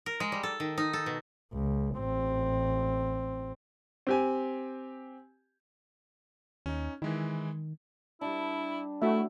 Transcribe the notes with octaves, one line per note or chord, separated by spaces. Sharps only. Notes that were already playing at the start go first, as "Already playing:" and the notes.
A#4
G#3
G3
A4
D#3
D#4
A4
B2
C#2
A1 C4
C4 G4 G#5
D#2 C#4 D#4
D#3 E3 G#3 E4
G3 D4 E4
A3 E4 F#4 E5